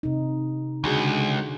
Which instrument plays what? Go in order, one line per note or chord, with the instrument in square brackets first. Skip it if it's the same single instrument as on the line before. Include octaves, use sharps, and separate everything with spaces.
[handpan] C3 D#4
[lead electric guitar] C#2 [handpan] D3 F#4 G#4